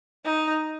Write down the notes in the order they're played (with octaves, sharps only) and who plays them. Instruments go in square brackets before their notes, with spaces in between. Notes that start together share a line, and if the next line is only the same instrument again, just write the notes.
[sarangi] D#4